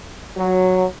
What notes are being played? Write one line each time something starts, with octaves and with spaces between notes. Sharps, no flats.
F#3